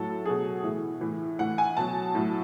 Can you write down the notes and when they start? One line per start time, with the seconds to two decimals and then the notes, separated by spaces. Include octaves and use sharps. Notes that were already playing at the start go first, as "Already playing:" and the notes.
Already playing: A2 F#3 A4
0.25 B2 F#3 G#4
0.63 A2 E3
1.01 A2 E3
1.39 A2 E3 F#5
1.58 G#5
1.77 B2 F#3 A5
2.15 A2 F#3